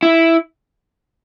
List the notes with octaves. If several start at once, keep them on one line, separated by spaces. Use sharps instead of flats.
E4